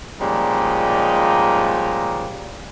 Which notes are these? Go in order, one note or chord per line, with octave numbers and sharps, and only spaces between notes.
A#2 F3 G3 G#3 C#4 D#4